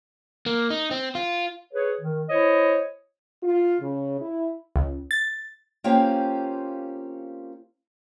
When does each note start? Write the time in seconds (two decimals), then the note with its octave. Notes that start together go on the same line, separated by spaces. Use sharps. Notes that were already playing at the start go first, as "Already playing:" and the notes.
0.46 A#3
0.70 D#4
0.91 C4
1.15 F4
1.73 G#4 B4 C#5
2.01 D#3
2.29 E4 C5 C#5 D#5
3.41 F4
3.80 C#3
4.20 E4
4.76 C#2
5.11 A6
5.84 A#3 C4 C#4 F4 G4